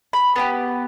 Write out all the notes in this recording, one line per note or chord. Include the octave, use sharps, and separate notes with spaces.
B5
B3 D4 G4